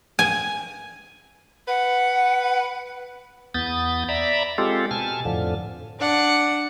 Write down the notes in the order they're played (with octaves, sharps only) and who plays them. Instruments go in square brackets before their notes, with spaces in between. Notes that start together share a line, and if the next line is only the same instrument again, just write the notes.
[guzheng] G#5
[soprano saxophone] B4 [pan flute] F#5
[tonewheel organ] E2 B3 D#6 G6 A6
D5 E5 A#5 B5
G#3 C4 F4 G4 A4
B2 G#5 A5 F6
F2 A2 D3 F3
[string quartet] D4 F#5